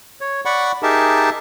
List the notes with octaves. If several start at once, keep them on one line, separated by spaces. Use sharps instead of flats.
C#5
D5 F#5 B5 C#6
D#4 G4 G#4 A#4 E5 A5